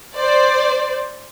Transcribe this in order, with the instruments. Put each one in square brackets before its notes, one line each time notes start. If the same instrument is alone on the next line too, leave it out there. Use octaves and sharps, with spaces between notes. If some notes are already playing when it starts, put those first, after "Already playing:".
[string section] C5 D5